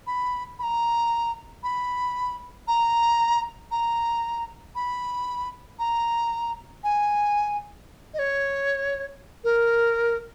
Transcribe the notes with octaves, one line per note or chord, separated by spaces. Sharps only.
B5
B5
A#5
B5
A#5
A#5
B5
A#5
G#5
D#5
C#5
A#4